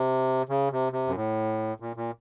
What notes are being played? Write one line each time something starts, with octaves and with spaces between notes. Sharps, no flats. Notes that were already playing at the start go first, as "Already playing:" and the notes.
Already playing: C3
C#3
C3
C3
F#2
A2
A#2
A#2